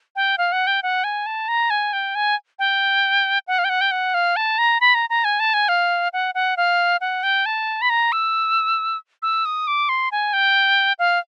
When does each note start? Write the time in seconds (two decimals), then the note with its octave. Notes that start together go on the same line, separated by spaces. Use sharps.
0.16 G5
0.38 F5
0.52 F#5
0.67 G5
0.83 F#5
1.04 G#5
1.26 A5
1.48 A#5
1.70 G#5
1.93 G5
2.15 G#5
2.59 G5
3.48 F#5
3.59 F5
3.64 G5
3.69 F#5
3.81 G5
3.91 F#5
4.14 F5
4.36 A5
4.58 A#5
4.81 B5
4.95 A#5
5.10 A#5
5.24 G#5
5.40 A5
5.54 G#5
5.69 F5
6.13 F#5
6.35 F#5
6.57 F5
7.01 F#5
7.23 G5
7.46 A5
7.82 B5
7.90 A#5
8.12 E6
9.22 E6
9.45 D#6
9.67 D6
9.89 C6
10.12 G#5
10.33 G5
10.99 F5